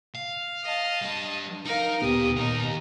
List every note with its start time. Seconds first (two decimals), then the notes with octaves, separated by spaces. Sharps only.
0.15 F5
0.64 D#5 A5
1.02 G3 D4
1.65 D#4 A#4 F5
2.01 D2 A#2 B3 G4 D#6
2.37 D#2 A#2 D#4 A#4